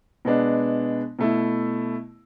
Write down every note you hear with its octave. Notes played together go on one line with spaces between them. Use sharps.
B2 G#3 B3 D4
B2 A3 E4